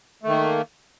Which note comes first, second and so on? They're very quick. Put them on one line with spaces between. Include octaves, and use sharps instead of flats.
A3 D#3 A#3